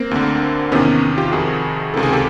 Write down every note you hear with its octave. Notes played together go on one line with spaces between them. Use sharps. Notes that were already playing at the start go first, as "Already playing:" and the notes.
Already playing: A#3 C4
D2 D3
E2 C3 D#3 B3 C#4
F4 G4
F2 C3 D#3 F#4 G#4
C#2 C3 D#3 A4
G#4
G4 A4